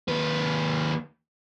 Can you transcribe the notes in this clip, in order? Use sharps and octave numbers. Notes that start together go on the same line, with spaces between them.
D#2 B4